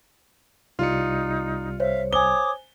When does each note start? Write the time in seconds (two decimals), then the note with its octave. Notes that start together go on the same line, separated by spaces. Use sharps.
0.79 C2 G3 D#4 F4 C#7
1.80 C5 C#5 E5 F5
2.13 C5 C#5 G#5 D6 D#6 G7